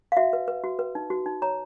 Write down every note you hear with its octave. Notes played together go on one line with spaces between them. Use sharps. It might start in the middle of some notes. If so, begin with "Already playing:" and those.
F5
F#4 E5
B4
B4
F#4
B4
D#4
F#4
D#4
C#5 A#5